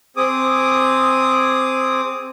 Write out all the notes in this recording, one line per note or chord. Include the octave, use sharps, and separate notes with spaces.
C4 G#4 D6 D#6